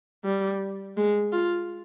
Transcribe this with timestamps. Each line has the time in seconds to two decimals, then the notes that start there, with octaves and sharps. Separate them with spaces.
0.24 G3
0.97 G#3
1.32 F4